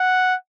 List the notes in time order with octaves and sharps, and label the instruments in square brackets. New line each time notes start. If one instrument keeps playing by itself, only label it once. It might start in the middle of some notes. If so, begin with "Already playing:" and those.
Already playing: [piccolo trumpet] F#5